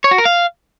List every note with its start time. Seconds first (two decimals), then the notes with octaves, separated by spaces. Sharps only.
0.04 C#5
0.11 F#4
0.18 A#4
0.25 F5